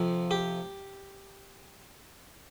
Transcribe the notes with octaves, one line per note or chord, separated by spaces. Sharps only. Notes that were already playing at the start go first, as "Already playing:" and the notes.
Already playing: F2 C3 F3
G4